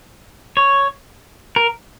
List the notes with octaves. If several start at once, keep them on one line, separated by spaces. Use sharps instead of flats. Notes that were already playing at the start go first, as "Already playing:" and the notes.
C#5
A#4